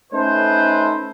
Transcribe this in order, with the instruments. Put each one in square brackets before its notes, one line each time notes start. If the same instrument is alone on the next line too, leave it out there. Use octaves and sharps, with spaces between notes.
[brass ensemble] A3 C#4 D#4 A4 B4 C5